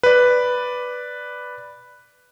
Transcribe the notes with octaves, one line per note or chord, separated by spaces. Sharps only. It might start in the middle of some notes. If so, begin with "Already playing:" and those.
B4 D5